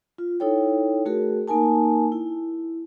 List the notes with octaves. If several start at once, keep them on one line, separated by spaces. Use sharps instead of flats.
F4
D#4 E4 A4 C#5 G5
A3 F#4 G#4 A#4
A#3 D#4 A#4 G#5 A5
E4